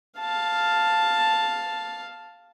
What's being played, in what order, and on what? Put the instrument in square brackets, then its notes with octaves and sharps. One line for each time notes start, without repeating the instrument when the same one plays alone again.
[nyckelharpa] F5 A5